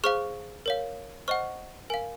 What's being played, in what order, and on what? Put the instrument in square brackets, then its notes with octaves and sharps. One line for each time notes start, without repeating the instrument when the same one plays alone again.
[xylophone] G#4 C5 F5 C#6 F6
A#4 C#5 F5
C5 D#5 F#5 C#6 F6
A#4 F5 G#5